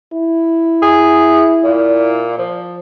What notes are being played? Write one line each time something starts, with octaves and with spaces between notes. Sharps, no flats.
E4
G#4
A#2
F3